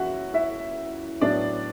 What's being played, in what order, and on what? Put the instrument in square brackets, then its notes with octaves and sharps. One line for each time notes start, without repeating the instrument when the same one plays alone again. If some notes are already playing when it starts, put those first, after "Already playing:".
Already playing: [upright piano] F#2 E3 E4 F#4 E5 F#5
E4 E5
A2 F#3 B3 D4 D5